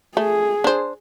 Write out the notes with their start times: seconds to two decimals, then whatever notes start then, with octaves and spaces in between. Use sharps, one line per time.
0.17 A3 G#4
0.64 D4 C5